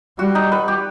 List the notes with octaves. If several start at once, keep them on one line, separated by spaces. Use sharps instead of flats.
G3 F#4
D#4
B4
G4